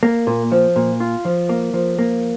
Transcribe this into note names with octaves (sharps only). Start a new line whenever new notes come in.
A#3
A#2
F3
A#2
F4
F3
A#3
F3
A#3